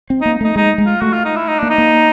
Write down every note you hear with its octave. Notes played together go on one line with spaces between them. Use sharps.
C4
A#3 D#4
A3 D#4
G#3 D#4
G#3
F4
A3 F#4
F4
D#4
E4
D#4
A#3 D4
D#4
A#3